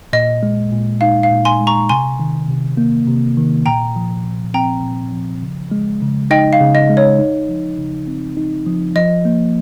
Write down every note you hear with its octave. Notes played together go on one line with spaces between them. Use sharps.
A#2 D#5
G#3
A#2
D#4 F5
F5
A#2
G#5 C6
G#3
A#5 C#6
C3 G#5 C6
D#3
C3
A#3
C3
D#3
A#2 G5 A#5
F3
A#2
C4 G5 A#5
A#2
F3
C#3
G#3
C#3
D#4 D#5 G5
F5
C#3
D#5
G#3
C#5
D#4
F3
C#3
C4
D#4
F3
F3 D#5
A#3